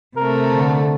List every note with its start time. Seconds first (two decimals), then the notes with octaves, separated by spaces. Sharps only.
0.16 C3 A3 A#4
0.49 D3